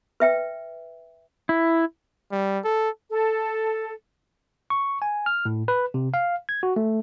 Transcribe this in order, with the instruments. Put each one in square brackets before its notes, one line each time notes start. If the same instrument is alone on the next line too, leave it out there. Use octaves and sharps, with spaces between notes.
[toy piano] B4 E5 G5
[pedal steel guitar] E4
[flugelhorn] G3
A4
[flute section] A4
[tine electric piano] C#6
G#5
F6
A2
B4
C3
F5
G#6
F#4
A3